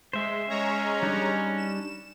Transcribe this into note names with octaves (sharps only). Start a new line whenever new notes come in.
G#3 C5 E5
G#3 C#4 C#5 A#5
G3 D4 D#4
E7